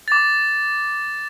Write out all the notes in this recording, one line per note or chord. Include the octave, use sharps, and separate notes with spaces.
D6 A6